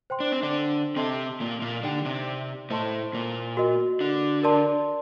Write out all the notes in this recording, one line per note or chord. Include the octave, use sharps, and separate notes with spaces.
C5 G5 C6
D4
C4
D3 D4
C3 C4 A4 D#5 A5 C6
A#2 A#3
A#2 A#3
D3 D4 D#4 G4 D5 G5
C3 C4
A2 A3 C5 D#5 A5 C6
A#2 A#3
F#4 A#4 D#5
D3 D4
A#4 D5 A5 C6